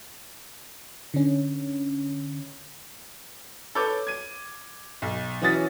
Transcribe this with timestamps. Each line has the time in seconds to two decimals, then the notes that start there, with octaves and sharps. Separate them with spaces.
1.14 D3 C#4
3.75 A4 B4 C#5 D6 G6
4.07 G#6 D#7
5.02 B1
5.42 E3 C#4 F#4 D#6 A6 B6